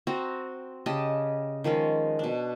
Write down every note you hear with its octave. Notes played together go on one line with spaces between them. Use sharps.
C4 F#4 A#5
C#3 G4 D#5 A5
D#3 F3 G#3 C#4
B2 D4